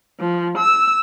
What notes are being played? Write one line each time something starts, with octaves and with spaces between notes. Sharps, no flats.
F3
E6